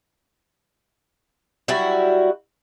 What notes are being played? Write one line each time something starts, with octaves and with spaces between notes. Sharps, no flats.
F#3 G3 E4 F#4